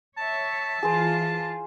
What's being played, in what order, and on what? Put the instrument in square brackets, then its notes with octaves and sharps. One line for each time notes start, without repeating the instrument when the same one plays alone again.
[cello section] C#5 E5 [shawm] A5
[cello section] E3 F4 [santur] G#4 C5